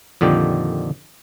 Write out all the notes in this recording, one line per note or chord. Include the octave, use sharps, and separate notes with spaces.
F2 A#2 D3 D#3 G4